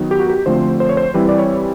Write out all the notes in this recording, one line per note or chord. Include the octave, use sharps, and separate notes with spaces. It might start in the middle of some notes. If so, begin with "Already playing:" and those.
Already playing: D#3 F#3 B3 D#4
G4
F#4
G4
D3 F3 A3 C4 C5
C5
C#5
C5
E3 G3 C4 E4 B4
D5
C#5